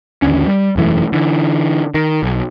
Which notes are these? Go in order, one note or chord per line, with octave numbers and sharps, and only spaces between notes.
A1 D#2 D3 C#4
G3
E1 F#2 E3 A3
D3 E3
D#3
B1